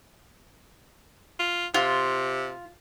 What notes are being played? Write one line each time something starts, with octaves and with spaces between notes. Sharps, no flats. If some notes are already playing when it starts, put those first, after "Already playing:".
F4
C3 F4